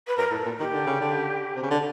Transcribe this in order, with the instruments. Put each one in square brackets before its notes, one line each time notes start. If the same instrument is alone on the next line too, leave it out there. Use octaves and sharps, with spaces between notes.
[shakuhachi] B4
[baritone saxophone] F#2 [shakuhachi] A#4
[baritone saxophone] A2 [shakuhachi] A4
[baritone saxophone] A#2
[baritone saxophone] D#3 [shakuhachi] G4
[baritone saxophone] D3
C#3
D3
C3
C#3
D3